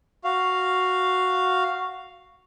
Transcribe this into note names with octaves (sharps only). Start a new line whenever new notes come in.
F#4 F5